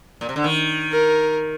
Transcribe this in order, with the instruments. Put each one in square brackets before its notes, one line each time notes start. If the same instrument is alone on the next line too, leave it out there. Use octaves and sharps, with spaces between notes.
[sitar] A#2
C3
D3
D#3
[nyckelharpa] A#4